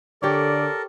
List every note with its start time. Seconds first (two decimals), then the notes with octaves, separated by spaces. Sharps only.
0.23 D3 G4 A4 A#4 C#5 D5